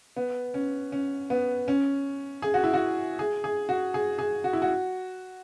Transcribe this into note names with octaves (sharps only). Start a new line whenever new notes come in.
B3
C#4
C#4
B3
C#4
G#4
F#4
E4
F#4
G#4
G#4
F#4
G#4
G#4
F#4
E4
F#4